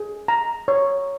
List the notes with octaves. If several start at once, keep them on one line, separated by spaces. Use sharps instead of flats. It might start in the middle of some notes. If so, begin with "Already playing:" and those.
Already playing: G#4
A#5
C#5